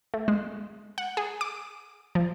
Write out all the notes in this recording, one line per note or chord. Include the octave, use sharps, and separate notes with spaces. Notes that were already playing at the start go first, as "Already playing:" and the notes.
A3
G#3
F#5
G#4
D6
F3